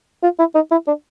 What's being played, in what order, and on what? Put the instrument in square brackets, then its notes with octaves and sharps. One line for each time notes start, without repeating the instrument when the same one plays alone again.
[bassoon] F4
E4
D#4
E4
D4